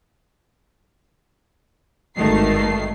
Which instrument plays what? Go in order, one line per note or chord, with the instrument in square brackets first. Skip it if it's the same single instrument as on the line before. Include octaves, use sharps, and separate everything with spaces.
[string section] G#1 G2 D#3 A3 C7